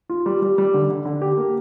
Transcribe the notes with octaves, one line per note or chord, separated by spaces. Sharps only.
F4
G3
G3
G3
D3
D3
D3
G4
A#3